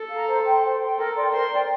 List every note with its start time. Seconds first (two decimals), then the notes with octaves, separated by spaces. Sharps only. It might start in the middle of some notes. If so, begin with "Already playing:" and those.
Already playing: A4
0.09 F5 A#5
0.27 C5
0.45 G5 C6
0.62 C5
0.80 G5 C6
0.98 A4 A#4
1.15 D5 G5 C6
1.33 A#4 C5
1.51 D5 G5 C6